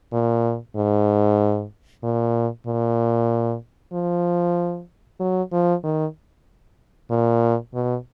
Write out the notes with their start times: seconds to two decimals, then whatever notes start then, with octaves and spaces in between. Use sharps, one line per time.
0.13 A#2
0.76 G#2
2.03 A#2
2.67 A#2
3.93 F3
5.20 F#3
5.53 F3
5.84 D#3
7.11 A#2
7.74 B2